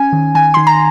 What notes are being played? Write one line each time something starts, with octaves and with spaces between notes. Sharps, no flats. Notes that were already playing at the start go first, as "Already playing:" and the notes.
Already playing: C#4 G#5
D#3
D#3 G#5
D#3 C6
A#5